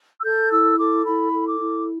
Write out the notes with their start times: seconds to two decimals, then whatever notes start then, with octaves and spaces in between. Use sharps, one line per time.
0.20 E6
0.24 A4 G6
0.51 E4 E6
0.78 A4 D6
1.05 E4 B5
1.33 A4
1.46 D6
1.59 E4